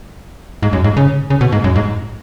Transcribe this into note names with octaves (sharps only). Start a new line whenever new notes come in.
G#2
F#2
G#2
C#3
C#3
B2
G#2
F#2
G#2